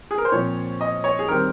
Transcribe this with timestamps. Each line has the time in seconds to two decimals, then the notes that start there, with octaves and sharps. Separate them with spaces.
0.11 G#4
0.18 A#4
0.25 C5
0.32 A#2 F3 C4 C#5
0.81 D#5
1.04 C#5
1.19 G#4
1.28 D#3 G3 C4 A#4